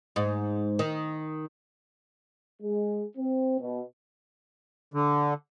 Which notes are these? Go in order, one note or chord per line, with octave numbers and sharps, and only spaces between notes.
G#2
D#3
G#3
C4
B2
D3